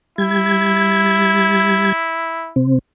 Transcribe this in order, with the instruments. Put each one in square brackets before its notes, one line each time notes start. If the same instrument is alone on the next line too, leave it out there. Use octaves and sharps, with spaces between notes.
[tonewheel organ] G3 G#6 [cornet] E4
[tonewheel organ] C3 C4